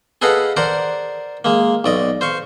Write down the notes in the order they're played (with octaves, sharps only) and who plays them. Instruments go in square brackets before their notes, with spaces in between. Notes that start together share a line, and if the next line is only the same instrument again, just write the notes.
[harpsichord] G#4 A4 B4 D#5 F5 F#5
A#4 C5 D5 F#5
G#3 A#3
B1 D5 D#5
C5 F5 C#6